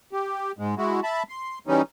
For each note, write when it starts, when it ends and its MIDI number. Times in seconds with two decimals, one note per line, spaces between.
0.13 0.52 67
0.59 0.75 44
0.59 0.75 56
0.77 1.00 56
0.77 1.00 64
0.77 1.00 66
1.03 1.23 76
1.03 1.23 81
1.03 1.23 83
1.29 1.59 84
1.67 1.82 49
1.67 1.82 52
1.67 1.82 55
1.67 1.82 61
1.67 1.82 63